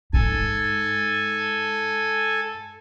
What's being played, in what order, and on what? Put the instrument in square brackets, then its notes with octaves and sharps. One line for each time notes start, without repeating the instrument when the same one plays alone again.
[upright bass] G#2 [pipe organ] A4 G#5